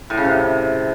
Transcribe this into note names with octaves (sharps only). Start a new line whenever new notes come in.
A2
C#3
C3